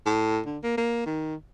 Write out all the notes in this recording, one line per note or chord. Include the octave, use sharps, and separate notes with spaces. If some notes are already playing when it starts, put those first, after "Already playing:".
A2
D3
A#3
A#3
D#3